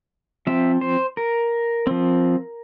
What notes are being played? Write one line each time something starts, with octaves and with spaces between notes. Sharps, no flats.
F3 C4 E5
C5
A#4
F3 C4